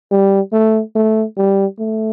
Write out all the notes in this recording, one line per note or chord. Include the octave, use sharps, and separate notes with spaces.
G3
A3
A3
G3
A3